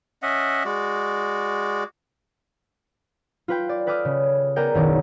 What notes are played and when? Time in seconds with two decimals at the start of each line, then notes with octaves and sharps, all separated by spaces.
0.22 C#4 D#5 E5 F#5
0.65 G#3 F#4 D5
3.48 F4 B4 G5
3.69 D5
3.86 A4 B4 G5 D6 D#6 F6
4.05 C#3
4.56 B3 G#4 A#4 D5 G5
4.74 F#1 B1 D#3 D6